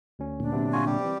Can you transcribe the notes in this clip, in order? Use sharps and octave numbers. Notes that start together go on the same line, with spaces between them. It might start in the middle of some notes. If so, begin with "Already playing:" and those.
D2 C#4
A#2 D3 D4
C3 F#3 B3
F4 F#4 G#5
G3 G4
E3 C4